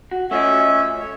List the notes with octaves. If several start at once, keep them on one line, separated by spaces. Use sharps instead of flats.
F#4
A3 C#4 F4 D#5 E5
C#5